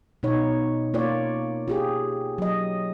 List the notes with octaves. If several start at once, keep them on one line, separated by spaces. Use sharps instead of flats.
B2 D#4 C#5
A#3 F4 C#5 D5
F4 G4 G#4
F#3 D#5